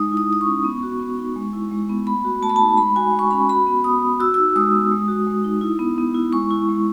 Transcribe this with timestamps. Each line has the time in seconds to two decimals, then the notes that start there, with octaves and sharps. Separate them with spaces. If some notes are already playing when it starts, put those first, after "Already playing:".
Already playing: G#3 D#4 D#6
0.12 E4
0.17 D#6
0.30 G#3 D#6
0.41 C#6
0.46 C#4
0.64 B3
0.83 F#4
1.00 B3
1.19 D#4
1.36 G#3
1.53 E4
1.71 G#3
1.90 B3
2.07 A3 B5
2.25 F#4
2.42 A3 A5
2.50 B5
2.56 D#4 A5
2.77 G#3 B5
2.96 F#4 G#5
3.13 G#3
3.19 C#6
3.31 C#4 B5
3.48 F#4 B5
3.67 B3
3.84 B3 D#6
4.02 F#4
4.20 F#4 E6
4.34 D#4 E6
4.56 G#3 D#6
4.73 B3
4.91 G#3
5.08 F#4
5.27 G#3
5.44 D#4
5.61 E4
5.79 B3
5.98 B3
6.15 E4
6.33 G#3 C#6
6.51 E4
6.69 G#3